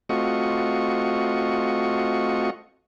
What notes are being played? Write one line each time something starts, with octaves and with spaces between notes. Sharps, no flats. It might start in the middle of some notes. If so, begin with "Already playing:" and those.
A3 C4 F4 F#4 D#5 C#6